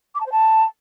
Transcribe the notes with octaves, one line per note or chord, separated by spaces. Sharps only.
D6
A5
C5
A5